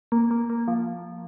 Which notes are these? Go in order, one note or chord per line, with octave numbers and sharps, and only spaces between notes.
A#3
A#3
A#3
F3